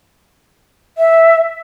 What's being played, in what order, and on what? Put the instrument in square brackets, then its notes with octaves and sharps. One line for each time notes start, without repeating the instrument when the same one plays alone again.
[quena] E5